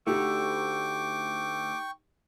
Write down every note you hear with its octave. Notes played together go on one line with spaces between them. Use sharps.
D2 A3 D#4 G4 G5 C#6 D6